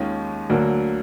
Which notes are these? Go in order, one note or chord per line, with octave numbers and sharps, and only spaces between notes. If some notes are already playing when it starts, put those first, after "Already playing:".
Already playing: D#2 D#3 G#3 C#4 F4
D2 D3 F#3 A#3